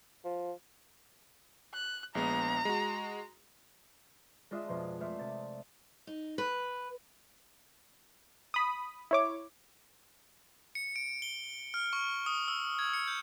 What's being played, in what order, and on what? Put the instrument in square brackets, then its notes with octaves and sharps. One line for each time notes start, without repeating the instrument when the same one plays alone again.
[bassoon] F3
[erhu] F#6
[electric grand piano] A#1 G#3 B3 [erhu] A#5
[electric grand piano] G#3 F#4
[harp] G#3 D4 F4 C5 D#5 E5
F2 B2 F3 C5
A3 D4 C5 D5 E5 F5
C3 A6
[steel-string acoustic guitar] D#4
B4
[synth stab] B5 D#6
E4 C#5 D6
[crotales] C#7
D7
G7
F6
C#6
D#6
E6
G#6
C#7
G6